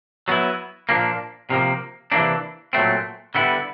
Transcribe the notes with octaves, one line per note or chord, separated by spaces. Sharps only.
F#3 B3 E4
A#2 F3 A#3 D4
C3 F3 A#3
C3 E3 G3 A#3 D4
A#2 F#3 A3 C4
D3 G3 B3 E4